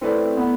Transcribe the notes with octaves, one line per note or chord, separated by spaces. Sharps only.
A3 C4 E4 B4 D5
B3